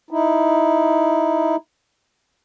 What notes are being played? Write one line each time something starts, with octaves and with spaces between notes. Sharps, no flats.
D#4 E4